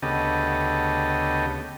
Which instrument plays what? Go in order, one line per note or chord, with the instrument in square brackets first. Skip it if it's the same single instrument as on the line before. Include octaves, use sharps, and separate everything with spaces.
[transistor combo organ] D2 C#3 B3 G4 A4 D#5